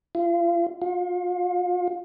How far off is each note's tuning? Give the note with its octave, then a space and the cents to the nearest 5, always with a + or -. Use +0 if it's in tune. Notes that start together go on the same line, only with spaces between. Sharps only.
F4 -35
F4 +35